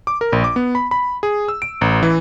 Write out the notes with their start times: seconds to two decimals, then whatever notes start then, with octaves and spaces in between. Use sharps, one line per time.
0.07 D6
0.21 A#4
0.33 A#1
0.44 D6
0.56 B3
0.75 B5
0.91 B5
1.23 G#4
1.48 E6
1.62 D7
1.81 A1
2.03 E3